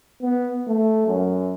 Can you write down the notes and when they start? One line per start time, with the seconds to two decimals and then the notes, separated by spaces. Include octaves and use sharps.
0.22 B3
0.68 A3
1.07 F#2